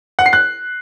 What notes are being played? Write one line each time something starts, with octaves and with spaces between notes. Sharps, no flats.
F#5
C7
F#6